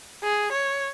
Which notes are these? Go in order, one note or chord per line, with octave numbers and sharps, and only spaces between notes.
G#4
C#5